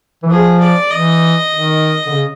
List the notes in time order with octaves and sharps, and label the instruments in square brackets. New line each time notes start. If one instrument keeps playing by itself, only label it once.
[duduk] E3
[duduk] F3 [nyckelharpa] G#4
[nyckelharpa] D5
[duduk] E3 [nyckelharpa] D#5
[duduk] D#3
D3
C#3